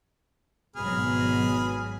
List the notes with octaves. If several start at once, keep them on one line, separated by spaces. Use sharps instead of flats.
G#1 G#2 B2 F#3 G#4 B5 F6